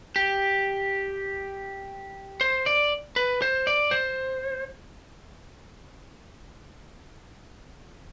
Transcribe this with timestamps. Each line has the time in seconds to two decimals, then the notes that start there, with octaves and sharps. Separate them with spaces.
0.16 G4
2.41 C5
2.66 D5
3.16 B4
3.42 C5
3.67 D5
3.91 C5